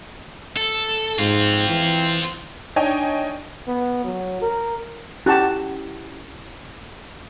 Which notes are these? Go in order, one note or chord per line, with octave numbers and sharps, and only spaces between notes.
A4
G#2 C4 F4
E3
D4 D#4 C#5 D#5 G5 G#5
B3
F#3
A#4
C#4 E4 F#4 G4 A5 B5